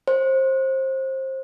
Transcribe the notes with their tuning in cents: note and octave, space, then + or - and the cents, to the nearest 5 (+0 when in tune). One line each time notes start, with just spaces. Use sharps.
C5 +25